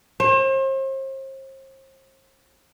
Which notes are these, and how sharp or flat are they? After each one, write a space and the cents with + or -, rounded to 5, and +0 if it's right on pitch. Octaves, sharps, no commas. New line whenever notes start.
C5 +40